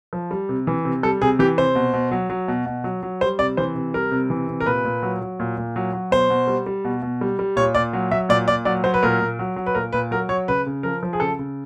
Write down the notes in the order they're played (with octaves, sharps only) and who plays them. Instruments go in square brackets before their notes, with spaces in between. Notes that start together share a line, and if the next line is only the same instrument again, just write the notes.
[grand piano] F3
G3
C3
E3
C3
G3 A4
C3 G#4
E3 G4
C3 C5
B2
B2
F#3
F#3
B2
B2
F#3
F#3
G3 C5
C3 D5
E3 C5
C3
G3 A#4
C3
E3
C3
A#4
A#2 B4
A#2
F#3
F#3
A#2
A#2
F#3
F#3
B2 C5
B2
G3
G3
B2
B2
G3
G3
A#2 C#5
A#2 D5
F#3
F#3 E5
A#2 D5
A#2 D5
F#3 D5
F#3 C5
B4
A#2 A#4
A#2
F#3
F#3
B4
A#2 A#4
A#2 B4
F#3 A#4
F#3 C#5
C#3 B4
C#3
F3 A#4
F3
G#4
C#3 A4
C#3